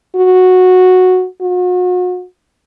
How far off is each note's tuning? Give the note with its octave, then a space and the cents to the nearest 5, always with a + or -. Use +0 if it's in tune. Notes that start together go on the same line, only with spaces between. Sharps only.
F#4 -5
F#4 -40